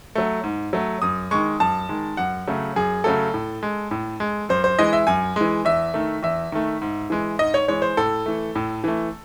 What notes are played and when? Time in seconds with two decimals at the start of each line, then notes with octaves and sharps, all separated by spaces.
0.15 F#3 A3
0.44 G#2
0.73 F#3 A3
1.02 F#2 D#6
1.31 D#3 G#3 C#6
1.60 F#2 A5
1.89 D#3 G#3
2.17 F#2 F#5
2.47 C#3 F#3 A3
2.76 F#2 G#4
3.04 C#3 F#3 A3 A4
3.34 A2
3.63 G#3
3.91 A2
4.20 G#3
4.49 F#2 C5
4.64 C5
4.79 E3 G#3 D#5
4.93 E5
5.07 F#2 G#5
5.36 E3 G#3
5.65 E2 E5
5.94 D#3 A3
6.23 E2 E5
6.52 D#3 A3
6.82 G#2
7.10 E3 G#3
7.39 G#2 D#5
7.54 C#5
7.68 E3 G#3 C#5
7.82 C5
7.97 A2 A4
8.26 E3 A3
8.55 A2
8.84 E3 A3